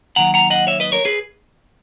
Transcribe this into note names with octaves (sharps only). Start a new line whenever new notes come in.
D#2 D#3 F#3 F#5 A#5
F#5 A#5
D#5 F#5
C#5 E5
B4 D#5
A#4 C#5
G#4 B4